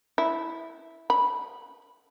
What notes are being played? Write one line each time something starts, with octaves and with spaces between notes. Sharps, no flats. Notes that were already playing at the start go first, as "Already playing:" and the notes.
E4
B5